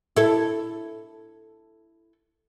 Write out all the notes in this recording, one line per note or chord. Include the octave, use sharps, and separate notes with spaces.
E4 A4